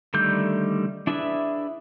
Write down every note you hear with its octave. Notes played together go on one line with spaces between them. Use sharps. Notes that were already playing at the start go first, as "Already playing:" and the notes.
D3 D#3 G3 A3 G6
D4 E4 G#4 B4 E5